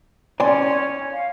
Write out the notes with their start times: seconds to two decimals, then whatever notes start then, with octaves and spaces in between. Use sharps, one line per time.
0.40 C#4 D5 G#5 C6
1.13 F5